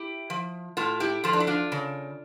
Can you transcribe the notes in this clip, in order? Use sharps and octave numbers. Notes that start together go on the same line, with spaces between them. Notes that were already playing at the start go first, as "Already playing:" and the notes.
Already playing: E4 G4
F3
A2 F4 A4
E4 G4
F3 F4 A4
D4
E4
D4 F4
C#3